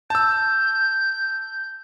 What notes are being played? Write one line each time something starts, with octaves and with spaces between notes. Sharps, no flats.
A5 E6 G6